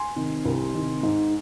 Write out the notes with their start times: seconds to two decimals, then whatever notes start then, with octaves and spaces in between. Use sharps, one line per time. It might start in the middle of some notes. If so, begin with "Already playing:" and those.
Already playing: G#5 C6
0.16 C3 D#3
0.45 C2
0.74 C3 D#3
1.03 G#2